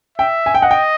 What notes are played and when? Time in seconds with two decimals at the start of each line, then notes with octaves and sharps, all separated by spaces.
0.18 E5 G5
0.46 G#5
0.55 G5
0.61 D#5 F#5
0.71 G5